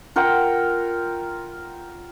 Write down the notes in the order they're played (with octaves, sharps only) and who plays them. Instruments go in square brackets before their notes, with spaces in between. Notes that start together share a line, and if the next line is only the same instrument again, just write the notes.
[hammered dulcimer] F4 A#4 F#5 G5